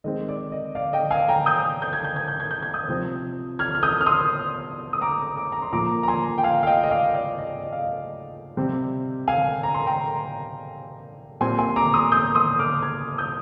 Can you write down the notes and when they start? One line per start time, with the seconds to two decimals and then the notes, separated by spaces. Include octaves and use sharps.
0.04 D#3 G#3 C4 D#5
0.28 D5
0.52 D#5
0.75 D5 F5
0.93 D#5 G5
1.10 F5 G#5
1.28 G5 A#5
1.46 D#6 G6
1.82 G6
1.93 G#6
2.04 G6
2.16 G#6
2.28 G6
2.40 G#6
2.51 G6
2.63 G#6
2.74 D#6 G6
2.88 C3 F3 C4
3.59 F6 G#6
3.75 F6
3.83 D#6 G6
4.01 F6
4.06 C6 D#6
4.93 D#6
5.01 A#5 D6
5.36 A#5 D6
5.52 A#5
5.62 C6
5.73 A#2 F3 A#3 A#5 D6
6.03 A#5
6.08 G#5 C6
6.38 G5
6.43 F5 G#5
6.63 F5
6.67 D#5 G5
6.83 D#5
6.91 D5 F5
7.14 D5 F5
7.38 D#5
7.62 D#5
7.72 F5
7.83 D#5
8.57 C3 G3 C4
9.28 F5 G#5
9.63 A#5
9.74 C6
9.86 G5 A#5
11.41 A#2 G3 C4 G#5 C6
11.58 G#5 C6
11.76 A#5 D6
11.94 C6 D#6
12.12 D#6 G6
12.35 C6 D#6
12.59 D6 F6
12.82 F6 G#6
13.18 D#6 G6